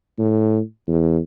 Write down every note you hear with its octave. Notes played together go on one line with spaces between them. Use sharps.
A2
E2